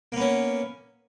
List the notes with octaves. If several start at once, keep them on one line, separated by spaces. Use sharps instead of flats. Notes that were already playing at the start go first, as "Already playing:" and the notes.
A#3 B3 C#4